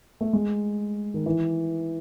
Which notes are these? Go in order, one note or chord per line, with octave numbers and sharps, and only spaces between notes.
A3
G#3
D#3
E3